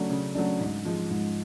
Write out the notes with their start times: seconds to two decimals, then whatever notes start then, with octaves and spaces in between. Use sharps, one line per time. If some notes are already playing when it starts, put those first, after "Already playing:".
Already playing: C#3 F#3 A3 D4
0.10 C#3
0.35 F#3 A3 D4
0.60 G#2
0.85 F3 G#3
1.10 G#2